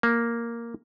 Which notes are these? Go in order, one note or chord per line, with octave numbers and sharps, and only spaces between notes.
A#3